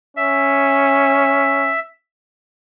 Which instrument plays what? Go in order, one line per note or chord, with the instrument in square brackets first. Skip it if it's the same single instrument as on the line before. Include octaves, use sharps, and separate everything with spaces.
[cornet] C#4 [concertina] E5